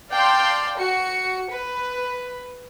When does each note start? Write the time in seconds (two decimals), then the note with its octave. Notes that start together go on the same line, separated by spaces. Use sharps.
0.11 D5 F5 G5 A5 C6
0.78 F#4 C#7
1.50 B4